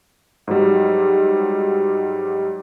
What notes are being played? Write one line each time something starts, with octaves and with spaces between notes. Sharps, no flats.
G#2 F#3 G3